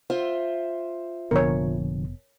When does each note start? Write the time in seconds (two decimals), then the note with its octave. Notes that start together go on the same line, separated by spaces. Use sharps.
0.10 F4 C5 E5
1.31 F1 A#2 D3 F3 B3 A#4 C#5